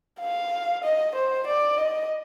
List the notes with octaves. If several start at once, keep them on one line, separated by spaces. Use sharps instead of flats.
F5
D#5
C5
D5
D#5